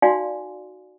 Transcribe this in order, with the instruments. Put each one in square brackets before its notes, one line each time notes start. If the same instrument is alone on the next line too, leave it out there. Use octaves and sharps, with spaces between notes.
[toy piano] D#4 F#4 D5 F5 G#5 C6